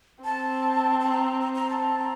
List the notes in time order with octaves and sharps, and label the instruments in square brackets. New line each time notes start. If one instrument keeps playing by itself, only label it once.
[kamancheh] C4 [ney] A5
[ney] A5
A#5
A#5
A#5
A5
A#5